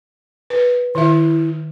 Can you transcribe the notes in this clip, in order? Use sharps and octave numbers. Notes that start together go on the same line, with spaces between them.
B4
D#3 E4 E5